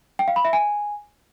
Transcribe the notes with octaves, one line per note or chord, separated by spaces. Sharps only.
G5
F5
B5
E5
G#5